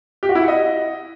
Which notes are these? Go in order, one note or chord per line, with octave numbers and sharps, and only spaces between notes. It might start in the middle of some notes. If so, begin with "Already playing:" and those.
G4
F#4
E4
F#5
D#5